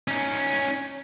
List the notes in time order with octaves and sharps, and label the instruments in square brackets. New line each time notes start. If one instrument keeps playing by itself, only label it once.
[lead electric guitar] C#4 D#4